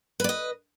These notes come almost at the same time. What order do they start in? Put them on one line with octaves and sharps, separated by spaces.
B4 D5 D#5